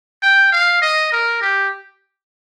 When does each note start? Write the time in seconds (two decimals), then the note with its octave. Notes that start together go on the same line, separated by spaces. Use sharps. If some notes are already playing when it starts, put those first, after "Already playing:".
0.22 G5
0.52 F5
0.82 D#5
1.12 A#4
1.41 G4